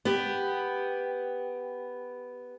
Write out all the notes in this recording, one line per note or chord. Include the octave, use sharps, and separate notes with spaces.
B3 G4